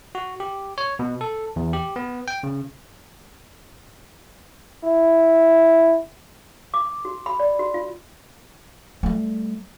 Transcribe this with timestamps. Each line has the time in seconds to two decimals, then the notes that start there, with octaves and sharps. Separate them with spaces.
0.15 F#4
0.40 G4
0.78 C#5
0.99 B2
1.21 A4
1.56 E2
1.73 G4
1.96 B3
2.28 G5
2.43 C#3
4.84 E4
6.74 D6
7.05 F#4
7.26 B5
7.40 D5
7.59 F#4
7.74 F4
9.03 G3 A3